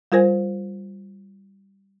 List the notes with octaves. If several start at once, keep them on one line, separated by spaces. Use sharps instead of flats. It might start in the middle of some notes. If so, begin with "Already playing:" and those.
G3 F4 A#4 C5 G#5